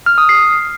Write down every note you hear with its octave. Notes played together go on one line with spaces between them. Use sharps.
F6
D#6
C7